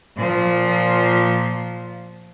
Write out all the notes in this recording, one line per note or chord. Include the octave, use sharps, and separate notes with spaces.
A#2 F3